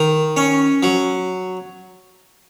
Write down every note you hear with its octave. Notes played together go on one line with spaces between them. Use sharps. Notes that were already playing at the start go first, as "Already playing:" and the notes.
Already playing: D#3
C#4
F#3